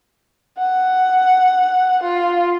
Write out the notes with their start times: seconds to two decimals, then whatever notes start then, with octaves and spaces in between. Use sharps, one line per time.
0.58 F#5
2.03 F4